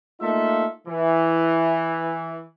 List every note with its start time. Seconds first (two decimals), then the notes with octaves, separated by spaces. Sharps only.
0.21 A3 A#3 D#4 F4 A4 E5
0.87 E3